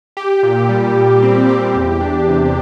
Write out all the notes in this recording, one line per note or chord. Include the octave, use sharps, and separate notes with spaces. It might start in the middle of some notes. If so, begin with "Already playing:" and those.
G4
A#2
G3
A#2
C4
G4
E2
D4
C3